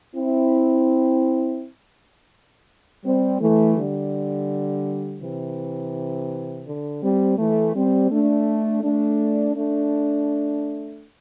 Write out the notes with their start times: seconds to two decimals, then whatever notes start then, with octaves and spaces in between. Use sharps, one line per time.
0.15 C4 E4
3.04 G3 C4
3.40 E3 A3
3.77 D3 G3
5.21 C3 E3
6.66 D3
7.02 G3 C4
7.38 E3 A3
7.74 G3 C4
8.10 A3 D4
8.82 A3 D4
9.55 A3 D4